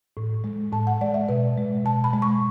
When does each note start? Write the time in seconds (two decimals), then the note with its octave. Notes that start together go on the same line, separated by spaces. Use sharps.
0.17 A2
0.44 G#3
0.72 A2 A5
0.87 F#5
1.01 G#3 D5
1.14 E5
1.29 B2 B4
1.58 G#3
1.85 B2 A5
2.04 B5
2.13 G#3
2.22 C#6